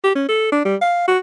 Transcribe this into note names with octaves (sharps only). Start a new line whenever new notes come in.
G4
C#4
A4
D4
G3
F5
F#4